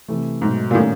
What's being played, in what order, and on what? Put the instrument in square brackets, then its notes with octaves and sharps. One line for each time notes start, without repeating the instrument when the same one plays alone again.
[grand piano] C3 E3 A3
[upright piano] G#2 [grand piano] B2 F#3 A3
[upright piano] A#2
[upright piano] A2 [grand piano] D#3 G3 A#3 C#4